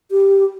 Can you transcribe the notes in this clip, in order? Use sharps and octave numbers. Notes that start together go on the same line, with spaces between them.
G4